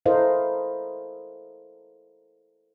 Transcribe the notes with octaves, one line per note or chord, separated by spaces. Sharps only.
E4 A4 A#4 C5 D#5 F5